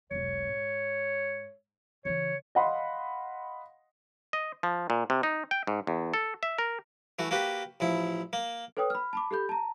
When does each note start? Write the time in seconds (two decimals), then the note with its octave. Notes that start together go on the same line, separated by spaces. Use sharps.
0.11 E1 B1 C#5
0.48 G#2
2.05 C#3 E3 C#5
2.55 D#5 F5 F#5 B5 C6
4.33 D#5
4.63 F3
4.90 A#2
5.10 C3
5.23 D#4
5.51 G5
5.67 G#2
5.87 E2
6.14 A4
6.43 E5
6.58 A#4
7.19 E3 A3 F#4
7.31 A#3 F#4 G4 B4
7.80 A1 F3 E4
8.33 A#3
8.77 A4 B4 C#5 G5 D#6
8.90 B5 F6
9.13 A5 B5 D6
9.31 G4 A4 B5 G6
9.49 A5 A#5